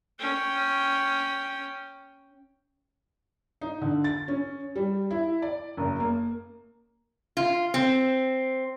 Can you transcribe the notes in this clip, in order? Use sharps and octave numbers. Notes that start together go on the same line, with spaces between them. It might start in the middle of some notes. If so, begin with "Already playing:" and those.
C#4 G5
D#4
D3
A6
C#4
G3
E4
D5
F#1
A#3
F4
C4